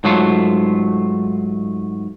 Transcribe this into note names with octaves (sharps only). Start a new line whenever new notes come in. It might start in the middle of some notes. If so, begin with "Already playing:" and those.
G#2 F#3 A3 F4